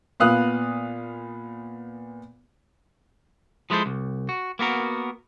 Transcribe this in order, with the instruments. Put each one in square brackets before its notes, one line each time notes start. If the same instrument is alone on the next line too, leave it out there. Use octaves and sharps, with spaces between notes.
[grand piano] A#2 B3 F5 D#6 F#6
[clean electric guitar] F3 G#3 E4 A4 C5
C2
F#4
A#3 B3 F#4 A#4